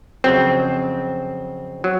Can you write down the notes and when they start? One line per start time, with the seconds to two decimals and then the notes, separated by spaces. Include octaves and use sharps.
0.24 F2 C#3 F#3 C4
1.84 F#3